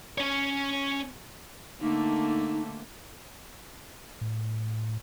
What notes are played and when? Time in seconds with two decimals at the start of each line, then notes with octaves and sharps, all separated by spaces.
0.18 C#4 C#5
1.81 D3 A3 A#3 D#4
4.21 A2